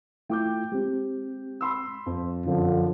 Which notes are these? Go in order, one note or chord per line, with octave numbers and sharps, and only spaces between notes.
A3 E4 F4 G5 D6 G6
G#3 C4 G4
B5 C6 E6
F2
F#2 D3 F3 D4